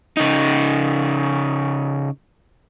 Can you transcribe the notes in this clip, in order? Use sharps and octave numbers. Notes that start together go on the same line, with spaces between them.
C#3 D#4